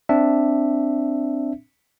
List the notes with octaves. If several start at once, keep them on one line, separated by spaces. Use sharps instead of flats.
C4 D4 E5